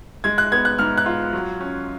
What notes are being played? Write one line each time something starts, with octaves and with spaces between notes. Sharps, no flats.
G#3 G#6
F#6
B3 G#6
F#6
G#2 F6
F#6
F4
F#3
C#4